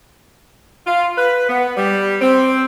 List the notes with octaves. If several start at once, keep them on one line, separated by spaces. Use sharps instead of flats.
F4
B4
B3
G3
C4